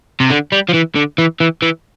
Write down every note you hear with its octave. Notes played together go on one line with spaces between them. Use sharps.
C3
D3
G3
F3
E3
D3
E3
E3
E3